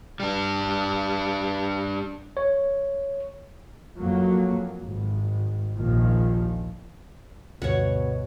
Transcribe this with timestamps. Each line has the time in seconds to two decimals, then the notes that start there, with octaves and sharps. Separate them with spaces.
0.20 G3 D4
2.37 C#5
3.96 F2 F#3 A#3
4.82 G#1
5.76 A#1 D#2 A#2 D#3 F3
7.62 D2 G2 B2 C#5 F#5